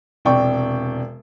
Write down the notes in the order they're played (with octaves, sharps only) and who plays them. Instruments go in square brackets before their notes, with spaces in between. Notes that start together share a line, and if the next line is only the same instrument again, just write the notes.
[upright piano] E1 C3 D5 G5 C#6